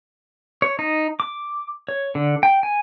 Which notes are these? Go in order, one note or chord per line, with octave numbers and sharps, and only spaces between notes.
C#5
D#4
D6
C#5
D3
G5
G#5